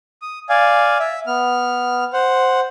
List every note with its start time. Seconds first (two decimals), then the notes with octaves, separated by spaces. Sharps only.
0.22 D#6
0.49 D5 F5 G#5
1.00 E5
1.27 B3 F6
2.13 C5 F#5